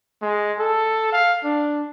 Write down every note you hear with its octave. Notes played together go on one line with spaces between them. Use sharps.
G#3
A4
F5
D4